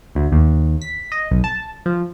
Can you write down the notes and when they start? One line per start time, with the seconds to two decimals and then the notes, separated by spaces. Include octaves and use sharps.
0.15 D2
0.32 D#2
0.82 B6
1.12 D#5
1.31 B1
1.44 A5
1.86 F3